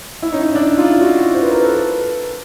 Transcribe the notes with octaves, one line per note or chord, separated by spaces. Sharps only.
E4
C#4 D#4
D4 E4
D#4 F4
E4 F#4
C5
B4
A#4
A4 B4